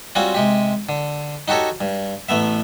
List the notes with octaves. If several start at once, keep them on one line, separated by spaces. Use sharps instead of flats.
G3 C4 C#4 F4 F#4
C3 G#3 G4
D3
D#4 F#4 G4 A4 C#5
G2
A1 A3 B3 E5